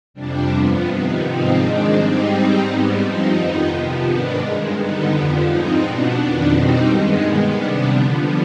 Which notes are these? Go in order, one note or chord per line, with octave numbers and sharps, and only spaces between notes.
F2 C3 G3 D4
G2 F3 B3
C3 D#3 B3
G#2 F3 C4 D#4
G#2 D#3 G#3 D4
G#2 G3 C4 D#4
G#2 G3 C4 D#4
G#2 G3 B3
G2 F3 C4 D#4
F2 D#3 B3 D#4
C3 F3 B3
G#2 D#3 B3 D4
G2 D#3 G#3
D3 G3 B3 D#4
F2 D3 F3 B3
G#2 F3 C4 D#4
B2 B3 D4
F2 D#3 B3 D4
B2 G3 C4 D#4
G2 D#3 G#3 B3
D#3 G#3 B3
C3 G3 B3 D4
D3 F3 B3